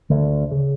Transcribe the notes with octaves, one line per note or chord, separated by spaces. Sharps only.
D2 D3
C#3